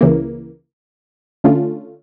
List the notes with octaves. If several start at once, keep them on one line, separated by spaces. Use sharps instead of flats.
C#2 C#3 E3 A#3
D3 A3 C#4 F4